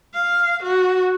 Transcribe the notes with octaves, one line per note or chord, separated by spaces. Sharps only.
F5
F#4